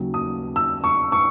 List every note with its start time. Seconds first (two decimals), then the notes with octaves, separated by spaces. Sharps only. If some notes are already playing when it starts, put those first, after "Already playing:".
Already playing: D#2 C#3 F#3
0.14 D#6
0.56 E6
0.84 C#6
1.12 C#6